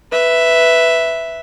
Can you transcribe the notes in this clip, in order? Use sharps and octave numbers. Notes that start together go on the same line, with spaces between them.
B4 E5